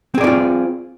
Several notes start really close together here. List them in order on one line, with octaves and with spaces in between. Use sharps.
C4 G#4 D5 D#4 F4